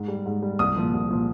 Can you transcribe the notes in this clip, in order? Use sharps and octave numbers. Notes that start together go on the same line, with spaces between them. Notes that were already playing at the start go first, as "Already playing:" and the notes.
Already playing: G#2
G3
G#2
G3
C2 D#6
A#2 F3
C2
A#2 F3